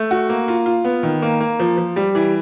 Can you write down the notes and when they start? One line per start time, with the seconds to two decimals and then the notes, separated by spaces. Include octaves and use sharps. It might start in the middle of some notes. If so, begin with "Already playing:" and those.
Already playing: A3
0.11 F#4
0.29 A#3
0.48 F4
0.66 F4
0.85 B3
1.03 D#3
1.22 A#3
1.40 A#3
1.60 F3
1.77 F3
1.96 G3
2.15 E3